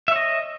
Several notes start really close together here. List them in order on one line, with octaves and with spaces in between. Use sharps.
E5 C#5 D#5